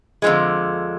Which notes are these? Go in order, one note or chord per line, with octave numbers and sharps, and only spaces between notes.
F2 D3 F3 G#3